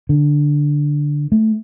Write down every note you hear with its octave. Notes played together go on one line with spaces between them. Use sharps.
D3
A3